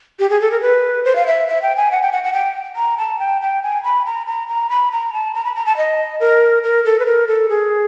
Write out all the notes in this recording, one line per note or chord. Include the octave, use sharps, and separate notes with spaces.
G4
G#4
A4
A#4
B4
C5
F5
E5
E5
G5
G#5
F#5
G5
F#5
F#5
G5
A#5
A5
G5
G5
G#5
B5
A#5
A#5
A#5
B5
A#5
A5
A#5
B5
A#5
A5
D#5
A#4
A#4
A4
B4
A#4
A4
G#4